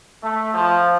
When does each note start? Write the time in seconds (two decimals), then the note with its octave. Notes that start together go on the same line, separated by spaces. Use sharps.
0.23 A3
0.54 F3